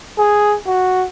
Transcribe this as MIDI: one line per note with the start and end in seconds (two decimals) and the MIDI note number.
0.18 0.58 68
0.67 1.06 66